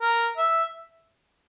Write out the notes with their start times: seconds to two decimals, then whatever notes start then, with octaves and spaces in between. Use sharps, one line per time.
0.01 A#4
0.38 E5